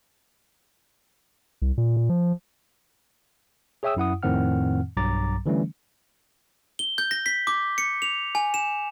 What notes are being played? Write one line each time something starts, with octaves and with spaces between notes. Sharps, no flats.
C2
A#2
A#2
F3
G#4 C#5 E5 G5 D#6 E6
F#2 E4 F#5 D#6
F2 A2 D#3 C4 F#5 F6
B1 G2 F#3 A#5 D6 A6
D3 E3 G3 A3 C#4
G7
G6
A#6
B6
D6
C#7
F7
G#5
E7